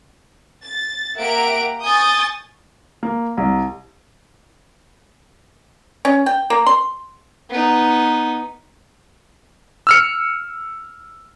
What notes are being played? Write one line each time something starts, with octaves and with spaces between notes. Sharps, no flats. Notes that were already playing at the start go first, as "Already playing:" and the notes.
A6
A#3 G4 E5 F#5 A#5 D7
G#5 C#6 D#6 G6 A6
A#3
C2
C#4
G5
A#3
C6
B3 D#4
E6 F6 C#7